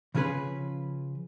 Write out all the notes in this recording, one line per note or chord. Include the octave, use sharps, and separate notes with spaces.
C#3 F3 C#4 G#4 B4